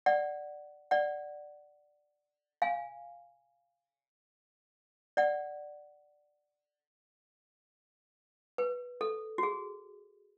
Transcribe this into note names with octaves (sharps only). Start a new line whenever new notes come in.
D5 F#5
D5 F#5
F5 G#5
D5 F#5
B4
A4
F#4
G#4